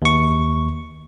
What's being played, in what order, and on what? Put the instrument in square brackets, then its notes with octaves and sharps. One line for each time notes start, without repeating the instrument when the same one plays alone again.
[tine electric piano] D#2 C#6